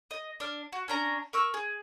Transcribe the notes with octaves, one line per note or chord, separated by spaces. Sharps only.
D#5
D4 F6
F#4
C#4 D4 A#5
A#4 C#6 E6
G#4